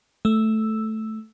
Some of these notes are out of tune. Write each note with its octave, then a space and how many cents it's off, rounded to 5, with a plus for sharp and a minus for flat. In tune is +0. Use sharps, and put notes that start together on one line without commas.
A3 -5 E6 +0